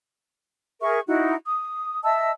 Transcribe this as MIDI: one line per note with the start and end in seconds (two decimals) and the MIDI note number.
0.81 0.99 68
0.81 0.99 70
0.81 0.99 76
0.81 0.99 85
1.06 1.34 63
1.06 1.34 64
1.06 1.34 66
1.45 2.02 87
2.04 2.30 75
2.04 2.30 76
2.04 2.30 81
2.04 2.30 88